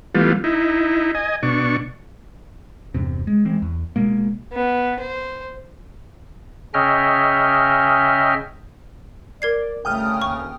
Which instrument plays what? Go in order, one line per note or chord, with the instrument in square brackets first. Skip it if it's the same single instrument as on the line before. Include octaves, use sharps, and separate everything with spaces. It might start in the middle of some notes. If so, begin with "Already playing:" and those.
[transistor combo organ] E3 G3 A3 B3 F4
D#4 E4
D#5 G#5
B2 D4 C#6
[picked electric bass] E2 G2 C3
G#3
E3 G#3 C4
E2
B2 G#3 A#3
[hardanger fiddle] B3
C5
[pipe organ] C#3 C#4 D#5 E5 G5 F6
[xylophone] A#4 G#6 C7 [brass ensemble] D5
[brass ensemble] D2 C#3 [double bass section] A3 [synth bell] G5 D#6 F6
[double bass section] D#2 [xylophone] C#6